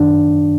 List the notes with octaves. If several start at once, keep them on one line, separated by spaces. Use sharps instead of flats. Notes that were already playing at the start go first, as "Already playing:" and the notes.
Already playing: F#2 D#3 D4